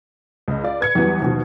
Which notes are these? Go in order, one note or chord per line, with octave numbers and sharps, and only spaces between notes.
C#2 D#5
F4 D5
B4 G#6 C#7
E2 E3 F#3 G3 B3
D#2 B2 F3